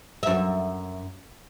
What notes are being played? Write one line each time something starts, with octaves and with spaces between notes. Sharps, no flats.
F#2 E5